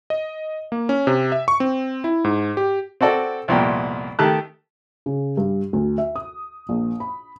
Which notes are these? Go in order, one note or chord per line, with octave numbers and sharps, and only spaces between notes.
D#5
A#3
C#4
C3
E5
C#6
C4
E4
G#2
G4
C4 F#4 A4 D5
C2 F2 A#2 B3 G5
D#3 A3 G4 A5 F#6
C#3
G2
D2
E5
D#6
A#1
B5